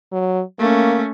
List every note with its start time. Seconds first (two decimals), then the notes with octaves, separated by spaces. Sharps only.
0.12 F#3
0.59 A3 A#3 C#4